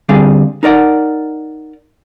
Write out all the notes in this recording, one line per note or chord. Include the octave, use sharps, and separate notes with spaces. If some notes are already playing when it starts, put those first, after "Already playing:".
D3 G3 C4 G#4 F5
D#4 A#4 D5 F#5